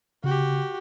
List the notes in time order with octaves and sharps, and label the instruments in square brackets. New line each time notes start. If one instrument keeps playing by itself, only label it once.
[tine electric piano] C#3 [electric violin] F#4 G4